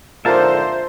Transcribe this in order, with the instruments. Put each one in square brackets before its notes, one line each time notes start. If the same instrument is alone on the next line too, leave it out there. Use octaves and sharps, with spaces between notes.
[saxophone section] F2 G#2 D3 [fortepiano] F4 A#4 [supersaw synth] C5 [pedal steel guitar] E5 A5